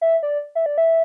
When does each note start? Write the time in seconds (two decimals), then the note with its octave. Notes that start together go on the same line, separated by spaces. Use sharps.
0.01 E5
0.23 D5
0.55 E5
0.66 D5
0.78 E5